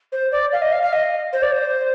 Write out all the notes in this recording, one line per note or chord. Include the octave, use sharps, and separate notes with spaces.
C5
D5
F5
D#5
F5
F5
D#5
C5
D5
C5